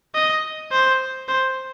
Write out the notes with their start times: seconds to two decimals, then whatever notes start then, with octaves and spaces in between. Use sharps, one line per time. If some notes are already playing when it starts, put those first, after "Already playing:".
0.15 D#5
0.71 C5
1.28 C5